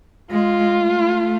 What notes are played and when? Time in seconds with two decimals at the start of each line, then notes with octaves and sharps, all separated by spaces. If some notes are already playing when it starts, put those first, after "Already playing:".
0.31 G#3 F4
0.79 A3